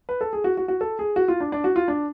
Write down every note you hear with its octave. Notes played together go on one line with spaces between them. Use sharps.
B4
A4
G#4
F#4
F#4
F#4
A4
G#4
F#4
F4
D4
D4
F#4
F4
D4